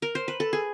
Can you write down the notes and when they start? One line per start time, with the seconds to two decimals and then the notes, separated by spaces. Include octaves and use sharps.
0.02 A#4
0.15 C5
0.28 B4
0.40 A4
0.53 G#4